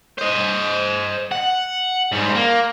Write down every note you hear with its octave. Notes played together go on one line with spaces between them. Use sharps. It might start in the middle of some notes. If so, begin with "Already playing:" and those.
C5 D#5
F#5
G#2 G3
A#3